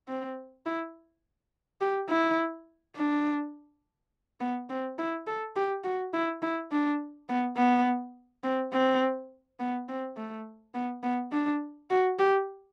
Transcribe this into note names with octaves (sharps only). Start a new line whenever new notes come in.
C4
E4
G4
E4
D4
B3
C4
E4
A4
G4
F#4
E4
E4
D4
B3
B3
C4
C4
B3
C4
A3
B3
B3
D4
F#4
G4